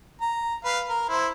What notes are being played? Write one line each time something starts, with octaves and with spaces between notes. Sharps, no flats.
A#5
B4 F5
A#4
E4 C5